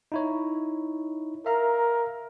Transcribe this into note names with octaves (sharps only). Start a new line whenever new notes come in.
D#4 E4 C#5
A#4 E5 F5 A#5